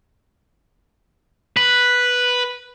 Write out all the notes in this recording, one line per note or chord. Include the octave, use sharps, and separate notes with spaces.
B4